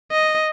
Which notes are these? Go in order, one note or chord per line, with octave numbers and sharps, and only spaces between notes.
D#5